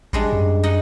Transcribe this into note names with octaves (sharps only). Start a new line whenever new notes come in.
A1 G3 G#3 D4
F#2
D#4 D#5 F#5